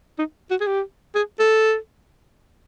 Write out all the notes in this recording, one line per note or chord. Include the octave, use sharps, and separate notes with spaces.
D#4
F#4
G#4
G4
G#4
A4